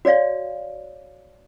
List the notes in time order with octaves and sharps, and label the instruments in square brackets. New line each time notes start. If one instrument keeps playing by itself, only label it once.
[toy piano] F#4 C#5 D5 F5